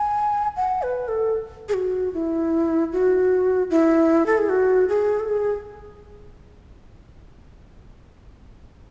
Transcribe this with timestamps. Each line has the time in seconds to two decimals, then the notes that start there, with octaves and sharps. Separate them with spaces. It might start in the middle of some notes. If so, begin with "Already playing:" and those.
Already playing: G#5
0.56 F#5
0.82 B4
1.08 A4
1.69 G#4
1.74 F#4
2.14 E4
2.92 F#4
3.70 E4
4.26 A4
4.38 G#4
4.49 F#4
4.89 G#4
5.20 A4
5.29 G#4